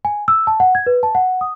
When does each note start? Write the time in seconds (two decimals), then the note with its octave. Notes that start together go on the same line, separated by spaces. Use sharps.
0.05 G#5
0.28 E6
0.47 A5
0.60 F#5
0.75 G#6
0.87 B4
1.03 A5
1.15 F#5
1.41 D#6